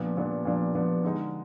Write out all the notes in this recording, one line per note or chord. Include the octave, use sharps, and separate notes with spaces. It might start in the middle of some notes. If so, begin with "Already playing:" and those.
Already playing: A#2 F3 B3 D4
A#2 F3 B3 D4
A#2 F3 B3 D4
A#2 F3 B3 D4
D3 G#3 D#4